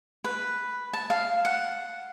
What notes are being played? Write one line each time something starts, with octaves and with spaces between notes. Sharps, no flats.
B4
A5
F5
F#5